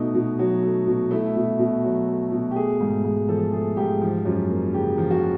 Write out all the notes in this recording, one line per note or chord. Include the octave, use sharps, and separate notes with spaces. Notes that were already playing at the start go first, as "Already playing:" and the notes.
Already playing: B2 A3 D#4
B2
F#3
A3
B2
A3 E4
B2
B2
F#3
A3
B2
G4
A3 G#4
G#2
G#2
F3 A4
A3 G#4
G#2 G4
F3
F#2
A#3
C#3 G4
F3
F#4